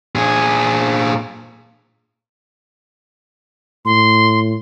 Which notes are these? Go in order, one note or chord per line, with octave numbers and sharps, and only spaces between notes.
A#2 G#4
A2 C6